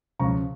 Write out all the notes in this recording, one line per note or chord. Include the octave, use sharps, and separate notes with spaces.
C#2 C#3 F3 A#5 C#6